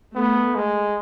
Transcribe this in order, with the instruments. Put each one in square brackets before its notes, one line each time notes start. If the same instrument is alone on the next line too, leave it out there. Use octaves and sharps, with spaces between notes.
[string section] A3 [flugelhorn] B3
[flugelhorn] G#3